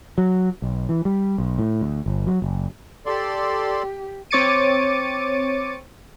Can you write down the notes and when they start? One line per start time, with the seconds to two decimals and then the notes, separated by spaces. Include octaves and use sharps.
0.18 F#3
0.62 B1
0.89 E3
1.05 G3
1.38 B1
1.59 A2
1.81 D2
2.06 G1
2.27 F#3
2.42 F#1
3.06 G4 A4 D5 C6
4.31 C4 C#5 D6 A6 C#7 D#7